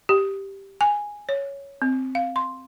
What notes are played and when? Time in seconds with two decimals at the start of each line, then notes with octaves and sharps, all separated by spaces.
0.09 G4
0.81 G#5
1.29 C#5
1.82 C4
2.15 F5
2.36 C6